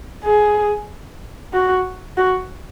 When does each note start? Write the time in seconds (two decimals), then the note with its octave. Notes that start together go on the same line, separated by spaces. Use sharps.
0.24 G#4
1.53 F#4
2.17 F#4